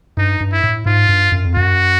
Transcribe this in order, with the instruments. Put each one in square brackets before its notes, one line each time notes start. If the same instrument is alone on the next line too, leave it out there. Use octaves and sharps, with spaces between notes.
[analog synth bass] G2 [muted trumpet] D#4
[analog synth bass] G2
[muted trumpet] E4
[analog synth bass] A2
[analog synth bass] G#2 [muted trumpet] F4
[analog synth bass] G2
F#2
F2
[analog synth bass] F#2 [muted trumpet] F#4